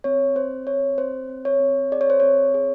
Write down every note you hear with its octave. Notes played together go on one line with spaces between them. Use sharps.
C4 C#5
C4 C5
C4 C#5
C4 C5
C4
C#5
C4
G#4 D5
C#5
C5
C4 C#5
G#4